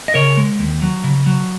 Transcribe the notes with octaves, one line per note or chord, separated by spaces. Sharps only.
D#5
C#3 A#4 C#5
G#3
D#2
F#3
C#3
F#3